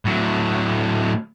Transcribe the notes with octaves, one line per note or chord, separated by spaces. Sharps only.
A2 F#3